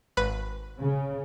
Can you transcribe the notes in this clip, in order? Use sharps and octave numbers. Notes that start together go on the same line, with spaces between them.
G#1 B4 F#6
C#3